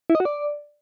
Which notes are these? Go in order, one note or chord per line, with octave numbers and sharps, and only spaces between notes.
E4
D#5
F#4
D5